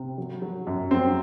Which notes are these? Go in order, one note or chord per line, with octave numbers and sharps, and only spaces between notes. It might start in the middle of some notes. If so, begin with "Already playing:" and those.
Already playing: C3
F#3
F#3
F#2
F#3 C4